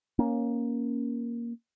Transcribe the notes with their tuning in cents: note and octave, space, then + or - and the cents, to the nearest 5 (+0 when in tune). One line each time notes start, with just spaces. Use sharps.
A#3 +10 C#4 +0